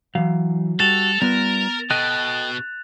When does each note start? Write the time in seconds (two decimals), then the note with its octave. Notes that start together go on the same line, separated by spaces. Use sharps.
0.15 E3 F#3 F5
0.80 G3 F#4 A4 A6 E7 F7
1.22 G3 B3 F4 A#4 B4
1.90 B2 A4 D#5 G5 F#6